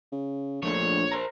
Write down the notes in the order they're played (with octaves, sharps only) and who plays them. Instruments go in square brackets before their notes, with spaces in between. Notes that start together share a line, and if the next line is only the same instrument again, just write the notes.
[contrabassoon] C#3
[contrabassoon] A#1 [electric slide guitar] F3 A3 D4 [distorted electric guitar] C#5
[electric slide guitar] A#4 C5 A#5